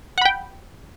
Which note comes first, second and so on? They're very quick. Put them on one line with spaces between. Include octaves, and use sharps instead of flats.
F#5 B5 G5